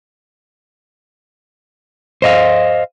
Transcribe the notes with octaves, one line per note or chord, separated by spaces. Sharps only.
C5 D#5 F5